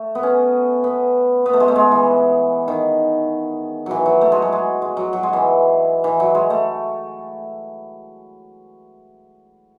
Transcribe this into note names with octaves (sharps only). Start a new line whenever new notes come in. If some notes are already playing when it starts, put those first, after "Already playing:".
Already playing: A3
B3
C#4
B3
B3
A3
G#3
A3
G#3
E3
D#3
E3 F#3
F#3
A3
G#3
F#3
G#3
G#3
F#3
F#3
G#3
E3
E3
F#3
G#3
A3